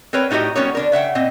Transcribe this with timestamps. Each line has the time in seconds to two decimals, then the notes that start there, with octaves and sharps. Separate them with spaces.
0.13 C4 A#4 B4 C#5 G5
0.31 A2 D#4 F#4 G4 D#5
0.56 G3 B3 C#4 F#4 A#4 C#5
0.75 D3 D4 A#4
0.92 C#3 E5 F#5 G5
1.15 A#2 C4 D#5